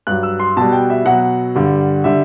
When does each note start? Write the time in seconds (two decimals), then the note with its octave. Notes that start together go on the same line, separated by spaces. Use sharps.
0.07 G2 F#3 F#6
0.23 E6
0.40 C6
0.57 B2 G3 A5
0.72 G5
0.90 E5
1.05 B2 F#3 F#5
1.55 G2 D3 G3
2.04 D3 G3 E5